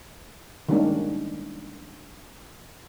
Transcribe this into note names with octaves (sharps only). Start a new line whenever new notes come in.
D#3 G3 G#3 A#3 C#4 D4